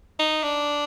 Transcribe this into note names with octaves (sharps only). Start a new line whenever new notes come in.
D#4
D4